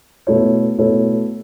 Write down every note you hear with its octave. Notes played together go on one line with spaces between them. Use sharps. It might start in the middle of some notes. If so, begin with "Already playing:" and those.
B2 A3 E4 A4 C#5
B2 A3 E4 A4 C#5